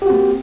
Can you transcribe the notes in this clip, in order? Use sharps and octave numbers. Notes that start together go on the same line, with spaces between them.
A#3 C4 F#4 G4